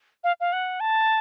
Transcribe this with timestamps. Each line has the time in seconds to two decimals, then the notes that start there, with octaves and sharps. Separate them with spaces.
0.24 F5
0.40 F5
0.53 F#5
0.80 A5